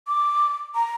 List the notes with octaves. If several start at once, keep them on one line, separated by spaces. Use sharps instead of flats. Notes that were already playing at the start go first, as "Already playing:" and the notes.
D6
A#5